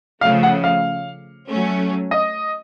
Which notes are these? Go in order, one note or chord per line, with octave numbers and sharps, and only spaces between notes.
C#3 F3 A3 F5
F#5
F5
F#3 A3 C#4
D#5